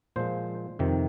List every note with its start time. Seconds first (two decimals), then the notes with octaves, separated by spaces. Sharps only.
0.16 A#2 F3 G#3 C5
0.79 F2 C3 D#3